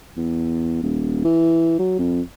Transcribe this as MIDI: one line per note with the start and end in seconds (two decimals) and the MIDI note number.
0.17 0.79 40
0.83 1.22 27
1.24 1.79 52
1.79 1.96 54
1.99 2.21 41